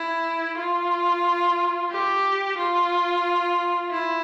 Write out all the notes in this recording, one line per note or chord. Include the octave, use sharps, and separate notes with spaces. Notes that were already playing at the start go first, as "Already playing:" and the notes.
Already playing: E4
F4
G4
F4
E4